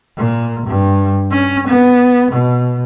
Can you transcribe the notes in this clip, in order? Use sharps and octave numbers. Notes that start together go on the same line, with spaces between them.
A#2
G2
C#4
B3
B2